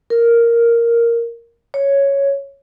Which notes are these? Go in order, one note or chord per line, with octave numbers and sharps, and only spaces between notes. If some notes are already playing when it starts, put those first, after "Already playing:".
A#4
C#5